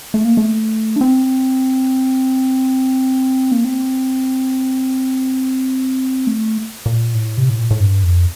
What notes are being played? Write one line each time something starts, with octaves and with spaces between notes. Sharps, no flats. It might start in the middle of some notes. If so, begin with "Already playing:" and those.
A3
A#3
A3
D4
C4
A#3
C4
A3
A#2
A2
C3
A2
A#2
A2
G2
F2